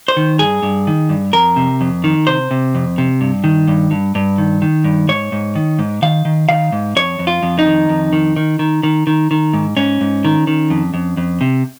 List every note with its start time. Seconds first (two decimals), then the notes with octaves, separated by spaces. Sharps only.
0.08 C5
0.17 D#3
0.39 G2 G#4
0.63 G2
0.87 D#3
1.09 G2
1.33 F2 A#4
1.56 C3
1.81 F2
2.04 D#3
2.27 C3 C5
2.51 C3
2.75 F2
2.98 C3
3.21 G2
3.44 D#3
3.68 G2
3.91 G2
4.15 G2
4.38 D#3
4.62 D#3
4.84 G2
5.08 G#2 C#5
5.32 G#2
5.56 D#3
5.79 G#2
6.02 D#3 F5
6.25 D#3
6.49 D#3 F5
6.72 G#2
6.96 F2 C#5
7.19 F2
7.27 F4
7.43 F2
7.59 D#4
7.66 D#3
7.89 F2
8.13 D#3
8.36 D#3
8.59 D#3
8.83 D#3
9.07 D#3
9.31 D#3
9.54 G#2
9.77 G#2 C#4
10.01 G#2
10.25 D#3
10.47 D#3
10.70 F2
10.94 F2
11.17 F2
11.41 C3